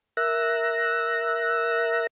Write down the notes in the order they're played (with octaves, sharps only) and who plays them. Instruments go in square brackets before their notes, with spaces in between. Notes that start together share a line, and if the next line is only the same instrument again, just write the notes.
[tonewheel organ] A#4 E5 E6 F#6 A#6